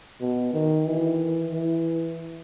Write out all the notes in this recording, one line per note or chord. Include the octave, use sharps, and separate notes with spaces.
B2
D#3
E3
E3